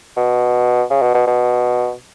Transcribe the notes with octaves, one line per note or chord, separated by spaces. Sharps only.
B2
C#3
B2
B2
B2